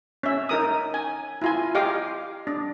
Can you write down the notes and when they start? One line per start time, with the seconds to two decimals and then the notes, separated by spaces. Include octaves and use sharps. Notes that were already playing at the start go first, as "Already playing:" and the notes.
0.23 C#4 E5
0.49 D#4 A#4 D#6
0.94 G#5
1.42 E4 F4 G#5
1.75 G4 D#5 F5 D6
2.47 D4